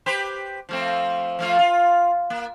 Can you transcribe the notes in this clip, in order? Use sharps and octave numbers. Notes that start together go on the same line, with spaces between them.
G4 B4 C5
F3 A3 C4
F3 A3 F4
F4
A#3